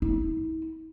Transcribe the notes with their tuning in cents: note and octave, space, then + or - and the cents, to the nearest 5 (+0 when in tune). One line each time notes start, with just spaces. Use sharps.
E4 -45